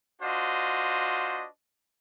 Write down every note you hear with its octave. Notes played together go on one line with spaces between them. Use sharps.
D4 F4 F#4 C5 D#5